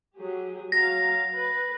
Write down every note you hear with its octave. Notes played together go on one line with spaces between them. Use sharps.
F#3 G4 G#4
F#3 F5 A#5 A#6
B4